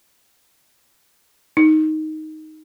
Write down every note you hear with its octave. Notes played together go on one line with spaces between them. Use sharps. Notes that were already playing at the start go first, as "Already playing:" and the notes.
D#4